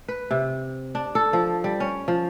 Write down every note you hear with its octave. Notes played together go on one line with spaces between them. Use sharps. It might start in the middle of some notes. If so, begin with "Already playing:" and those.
B4
C3
D4
A4
F3
G3
C#4
F3